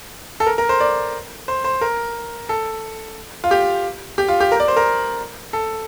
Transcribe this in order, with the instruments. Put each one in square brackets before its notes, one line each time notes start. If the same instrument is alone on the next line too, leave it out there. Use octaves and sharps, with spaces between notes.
[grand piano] A4
A#4
A#4
C5
D5
C5
C5
A#4
A4
F4
G4
G4
F4
G4
A#4
D5
C5
A#4
A4